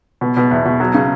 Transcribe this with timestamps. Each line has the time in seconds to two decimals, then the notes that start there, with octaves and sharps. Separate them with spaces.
0.21 B2
0.37 B2
0.51 E2
0.65 B2
0.80 F#3
0.94 C#3